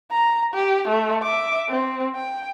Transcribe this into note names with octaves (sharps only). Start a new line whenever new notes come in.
A#5
G4
A3
E5 D6
C4
G5